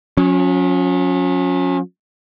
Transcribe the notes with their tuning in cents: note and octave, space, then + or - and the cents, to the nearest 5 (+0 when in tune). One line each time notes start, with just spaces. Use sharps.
F#3 -45 C#4 +0